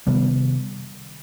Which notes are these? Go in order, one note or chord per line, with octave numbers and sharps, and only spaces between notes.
C3 D#3 G3 B3